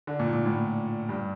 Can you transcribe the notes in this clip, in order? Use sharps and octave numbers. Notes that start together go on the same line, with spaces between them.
D3
A#2
A#2
A2
G2